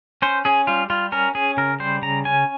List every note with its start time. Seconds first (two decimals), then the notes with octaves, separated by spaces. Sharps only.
0.22 C#4 C5
0.45 C#4 G#4
0.67 G3 F4
0.90 G3 F4
1.12 C#4 A#4
1.35 C#4 G#4
1.57 C#3 A#4
1.80 G3 C5
2.02 C#3 A#5
2.25 C#4 G#5